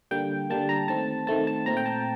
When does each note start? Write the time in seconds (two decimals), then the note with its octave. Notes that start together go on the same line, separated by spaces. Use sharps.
0.11 D3 G3 A#3 G5
0.50 D3 G3 A#3 A5
0.69 A#5
0.88 D#3 A3 C4 A5
1.27 D#3 A3 C4 A5
1.47 A5
1.66 A#2 A3 C4 A#5
1.77 G5
1.86 A5